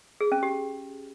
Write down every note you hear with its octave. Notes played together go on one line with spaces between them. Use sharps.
G#4
C#4
G4